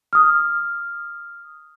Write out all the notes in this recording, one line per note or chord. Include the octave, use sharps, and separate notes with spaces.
D#6 F6